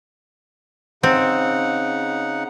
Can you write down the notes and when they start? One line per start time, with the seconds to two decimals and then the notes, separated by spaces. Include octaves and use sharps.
1.03 C#3 C4 D#4 F#5